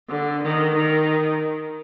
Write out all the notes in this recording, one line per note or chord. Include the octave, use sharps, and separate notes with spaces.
D3
D#3
D#3